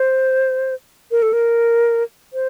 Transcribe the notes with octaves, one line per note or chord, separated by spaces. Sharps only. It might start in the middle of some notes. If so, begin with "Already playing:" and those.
Already playing: C5
A#4
A4
A#4
C5